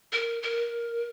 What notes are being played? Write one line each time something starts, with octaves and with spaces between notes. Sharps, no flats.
A#4
A#4